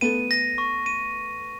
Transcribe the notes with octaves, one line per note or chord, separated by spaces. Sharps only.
A3 B3 D#7
A#6
C#6
D#7